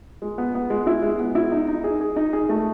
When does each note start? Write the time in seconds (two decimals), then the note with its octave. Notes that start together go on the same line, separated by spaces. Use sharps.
0.22 G#3
0.38 B3
0.55 B3
0.70 G#3
0.87 E4
1.02 G#3
1.20 B3
1.35 E4
1.52 D#4
1.68 D#4
1.84 G#4
2.01 G#4
2.16 D#4
2.33 G#4
2.49 A3